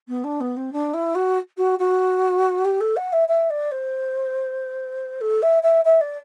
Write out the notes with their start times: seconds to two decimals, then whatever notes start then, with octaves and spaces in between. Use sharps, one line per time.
0.08 B3
0.24 D4
0.40 B3
0.56 C4
0.72 D4
0.93 E4
1.15 F#4
1.57 F#4
1.79 F#4
2.64 G4
2.80 A4
2.96 F#5
3.12 E5
3.28 E5
3.50 D5
3.71 C5
5.21 A4
5.42 E5
5.63 E5
5.85 E5
6.01 D5